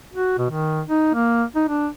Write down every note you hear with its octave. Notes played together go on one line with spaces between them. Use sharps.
F#4
B2
D#3
D#4
A#3
D#4
D4